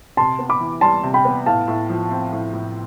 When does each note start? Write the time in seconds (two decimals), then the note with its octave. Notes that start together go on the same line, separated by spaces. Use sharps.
0.17 C3 A5 C6
0.39 B3
0.49 B5 D6
0.60 E3
0.81 G3 A5 C6
1.03 C3
1.14 G5 B5
1.25 B3
1.46 A2 F5 A5
1.68 A2
1.90 F3
2.11 C4
2.32 A2
2.54 A2